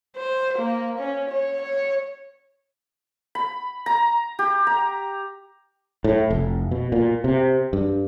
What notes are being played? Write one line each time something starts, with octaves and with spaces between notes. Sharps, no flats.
C5
A#3
C#4
C#5
C#5
B5
A#5
G4
A#5
A2
F1
B2
A#2
C3
G2